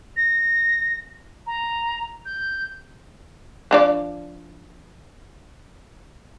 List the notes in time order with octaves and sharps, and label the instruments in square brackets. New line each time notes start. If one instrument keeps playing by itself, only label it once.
[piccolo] A#6
A#5
G6
[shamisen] F3 D4 D5